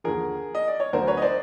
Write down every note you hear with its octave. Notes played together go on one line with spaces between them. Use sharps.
D#2 D3 F3 G#4 A#4
D#5
D5
C#5
D2 D3 F#3 A#4 C5
B4 C#5
D#5
C5 D5